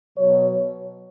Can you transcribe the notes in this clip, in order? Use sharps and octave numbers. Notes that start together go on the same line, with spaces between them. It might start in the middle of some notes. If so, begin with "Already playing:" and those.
B2 F#3 C#5